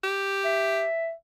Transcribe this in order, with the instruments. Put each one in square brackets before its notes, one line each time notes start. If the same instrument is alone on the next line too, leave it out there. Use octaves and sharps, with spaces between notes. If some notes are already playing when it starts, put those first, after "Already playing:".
[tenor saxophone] G4
[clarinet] E5